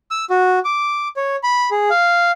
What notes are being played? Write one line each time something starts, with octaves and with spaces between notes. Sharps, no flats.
E6
F#4
D6
C#5
B5
G#4
F5